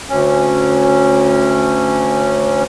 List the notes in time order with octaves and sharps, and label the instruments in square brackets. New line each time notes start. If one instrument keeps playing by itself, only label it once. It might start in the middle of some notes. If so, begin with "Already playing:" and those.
[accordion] D2 C#4